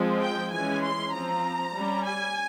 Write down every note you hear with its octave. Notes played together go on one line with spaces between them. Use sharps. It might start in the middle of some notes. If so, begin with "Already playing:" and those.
Already playing: F3 G#3 C4
G5
E3 G#3 C#4 G#5
C6
F3 C4 A#5
G3 C#4
G#5